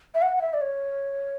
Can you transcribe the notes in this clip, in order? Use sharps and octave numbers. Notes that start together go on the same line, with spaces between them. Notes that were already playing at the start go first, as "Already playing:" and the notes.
E5
F#5
F#5
E5
D5
C#5